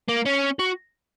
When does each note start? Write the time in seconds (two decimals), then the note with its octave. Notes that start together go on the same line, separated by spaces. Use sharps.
0.08 A#3
0.25 C#4
0.59 F#4